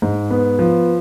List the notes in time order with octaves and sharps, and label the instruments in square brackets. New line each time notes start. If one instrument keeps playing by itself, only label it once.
[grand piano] G#2
B3
F3